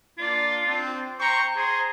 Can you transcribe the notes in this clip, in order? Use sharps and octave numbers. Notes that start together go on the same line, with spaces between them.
A#3 D4 F4 D5
C4 D4
C5 G5 A#5 C#6
G#4 C5 A#5 C6